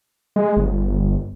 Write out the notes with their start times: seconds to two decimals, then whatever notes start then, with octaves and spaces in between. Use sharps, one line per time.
0.36 G#3
0.57 G1